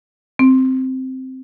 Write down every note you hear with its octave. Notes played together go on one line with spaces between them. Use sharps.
C4